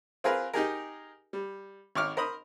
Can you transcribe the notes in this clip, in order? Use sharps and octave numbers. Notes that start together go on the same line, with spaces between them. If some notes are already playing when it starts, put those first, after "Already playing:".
C4 F4 G#4 A#4 B4
D#4 G4 G#4 A#4
G3
G#1 C#5 D6 F6
A#4 C5 B5 D#6